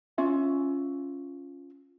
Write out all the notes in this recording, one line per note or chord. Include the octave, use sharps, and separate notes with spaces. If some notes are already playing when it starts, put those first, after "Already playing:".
C#4 F4 E5